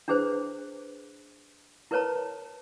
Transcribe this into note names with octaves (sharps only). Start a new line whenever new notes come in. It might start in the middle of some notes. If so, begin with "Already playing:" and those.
D4 E4 G#4 B4 C5
E4 A#4 B4 C#5 A5 A#5